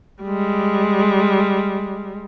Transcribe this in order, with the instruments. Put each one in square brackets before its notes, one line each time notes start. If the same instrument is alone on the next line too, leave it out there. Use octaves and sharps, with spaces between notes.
[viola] G3 G#3